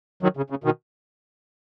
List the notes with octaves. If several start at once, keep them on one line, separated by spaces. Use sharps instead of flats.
D#3 F#3
C#3
C#3
B2 D#3